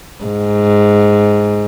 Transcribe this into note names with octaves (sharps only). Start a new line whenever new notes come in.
G#2